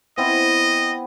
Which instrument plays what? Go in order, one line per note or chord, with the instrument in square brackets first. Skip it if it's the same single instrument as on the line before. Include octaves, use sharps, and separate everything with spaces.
[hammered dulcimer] B3 C4 E4 [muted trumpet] D#5